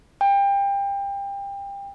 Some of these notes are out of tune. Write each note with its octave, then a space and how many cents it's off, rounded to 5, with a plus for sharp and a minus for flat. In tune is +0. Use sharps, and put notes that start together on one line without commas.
G5 +25